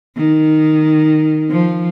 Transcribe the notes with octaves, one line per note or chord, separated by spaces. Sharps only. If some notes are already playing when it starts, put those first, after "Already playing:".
D#3
F3